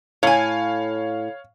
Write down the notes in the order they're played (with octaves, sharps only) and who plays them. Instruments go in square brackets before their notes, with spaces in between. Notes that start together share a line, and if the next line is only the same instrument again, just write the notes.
[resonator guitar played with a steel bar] A2 G#5 [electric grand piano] C#5 F5